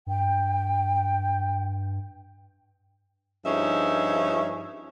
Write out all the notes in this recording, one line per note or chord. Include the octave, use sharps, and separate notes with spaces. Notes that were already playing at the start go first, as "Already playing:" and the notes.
G2 G5
G2 F3 C#4 D#4 G#4 E5